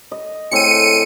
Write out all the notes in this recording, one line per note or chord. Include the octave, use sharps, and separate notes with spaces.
D#5
A2 C4 G#4 C#7 D#7